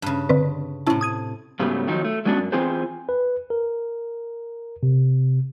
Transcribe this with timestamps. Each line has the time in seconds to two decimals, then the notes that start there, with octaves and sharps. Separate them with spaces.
0.02 G2 C#3
0.29 D3 C4 B4
0.87 A2 C3 C#4 E4 A5
1.01 D#6 G#6 D#7
1.60 G#2 C#3 F#3 G3 A3 B3
1.87 D#3 F3 F#3 D#4
2.05 A3
2.25 F#3 G#3 B3 C#4 D4 F#4
2.39 F#2
2.52 E3 C4 F4 G#4 B4 C5
3.09 B4
3.50 A#4
4.83 C3